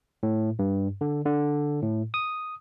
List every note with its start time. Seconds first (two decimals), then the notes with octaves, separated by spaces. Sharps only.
0.23 A2
0.59 G2
1.01 D3
1.26 D3
1.82 A2
2.14 D#6